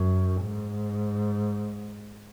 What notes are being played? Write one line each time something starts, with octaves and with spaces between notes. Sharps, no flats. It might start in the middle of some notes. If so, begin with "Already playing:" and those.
Already playing: F#2
G#2